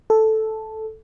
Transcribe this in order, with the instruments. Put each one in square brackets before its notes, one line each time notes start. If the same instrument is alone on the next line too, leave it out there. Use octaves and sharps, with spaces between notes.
[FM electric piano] A4